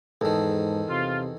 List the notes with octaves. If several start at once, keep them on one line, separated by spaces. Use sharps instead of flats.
E2 G#2 D#3 A4
C3 F4